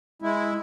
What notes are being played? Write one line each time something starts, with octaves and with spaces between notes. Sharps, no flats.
G#3 E4